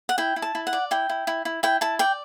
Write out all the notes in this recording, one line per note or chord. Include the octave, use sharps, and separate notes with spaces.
F#5
E4 G5
E4
A5
E4
F#5
D5
E4 G5
E4
E4
E4
E4 G5
E4 A5
D5 G5